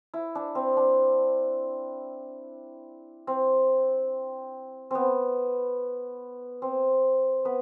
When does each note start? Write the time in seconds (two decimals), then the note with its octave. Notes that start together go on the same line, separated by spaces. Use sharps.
0.14 E4
0.35 D4
0.55 C4
0.77 D4
3.27 C4
4.91 B3 C4
6.62 C4
7.45 B3 B4